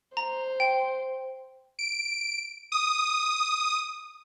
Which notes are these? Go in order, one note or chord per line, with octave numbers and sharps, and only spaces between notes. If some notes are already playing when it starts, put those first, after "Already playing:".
C5 A#5
G5
D7
D#6